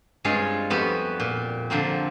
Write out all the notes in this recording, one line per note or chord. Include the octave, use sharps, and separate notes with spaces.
G2 G#3 C4 F4 G#4 C#5
F2 G3 B3 F#4 G4 E5
A#2
D3 F3 A#3 C4